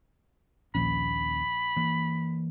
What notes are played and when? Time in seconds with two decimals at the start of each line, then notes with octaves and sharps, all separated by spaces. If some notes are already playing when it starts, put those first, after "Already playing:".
0.75 A#1 D#2 C#4 B5
1.76 E3 A#3